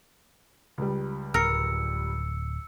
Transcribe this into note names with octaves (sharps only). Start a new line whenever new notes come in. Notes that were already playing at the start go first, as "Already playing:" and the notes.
C#2 G3
D1 A#4 E6 C#7